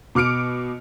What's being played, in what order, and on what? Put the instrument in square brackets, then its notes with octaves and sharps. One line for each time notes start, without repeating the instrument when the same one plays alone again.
[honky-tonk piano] B2 D6 F6 C#7 D7